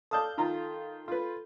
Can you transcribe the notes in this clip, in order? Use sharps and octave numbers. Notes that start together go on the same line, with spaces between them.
A4 D5 F5 A5 D#6 G6
D#3 F4 A#5
F4 B4